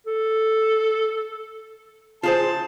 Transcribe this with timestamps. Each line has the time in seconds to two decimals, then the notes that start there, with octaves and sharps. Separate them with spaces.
0.07 A4
2.23 F4 G#4 C5 A5